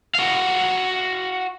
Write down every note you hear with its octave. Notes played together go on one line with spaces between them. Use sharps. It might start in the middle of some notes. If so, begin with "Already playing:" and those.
F#4 F5